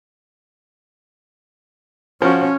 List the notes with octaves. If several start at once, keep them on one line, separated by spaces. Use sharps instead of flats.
F3 C#4 F#4